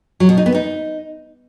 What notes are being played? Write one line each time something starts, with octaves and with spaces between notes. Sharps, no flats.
F#3
B2
D#4
B3
D#4